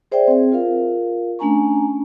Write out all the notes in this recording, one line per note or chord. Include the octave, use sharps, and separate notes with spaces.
G#4 C5 D5 E5 G5
C4 G#4
F4 A#4 F5
A3 C#4 D4 G#5 A#5 C#6